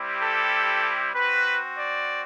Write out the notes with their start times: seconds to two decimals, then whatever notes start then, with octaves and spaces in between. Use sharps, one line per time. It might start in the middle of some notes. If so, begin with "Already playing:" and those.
Already playing: G3 C4 E4 G4
0.22 A4
1.15 C4 F#4 B4
1.77 D5